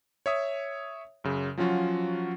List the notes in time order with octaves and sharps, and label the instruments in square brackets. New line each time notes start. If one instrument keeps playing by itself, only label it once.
[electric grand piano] C#5 E5 D#6
F#2 C#3
F3 F#3 C#4 F4 F#4